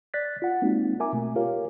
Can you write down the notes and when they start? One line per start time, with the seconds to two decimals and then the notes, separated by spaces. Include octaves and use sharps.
0.14 D5 F#6 A6 B6
0.42 F4 F#5
0.62 G#3 A#3 C4 D#4 F#4
1.00 A#4 E5 G#5 A#5 D6
1.13 B2 A3
1.36 F4 G4 A#4 C#5 F5